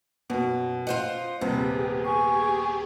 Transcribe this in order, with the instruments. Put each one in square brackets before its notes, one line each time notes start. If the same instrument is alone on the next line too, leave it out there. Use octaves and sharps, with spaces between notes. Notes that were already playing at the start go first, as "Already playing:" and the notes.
[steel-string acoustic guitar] F#2 [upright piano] B2
[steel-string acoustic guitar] F4 C5 D#5 [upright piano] F#5
[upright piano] D#1 C3 [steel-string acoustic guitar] B3 [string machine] G4 G#4
[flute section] G#5 C#6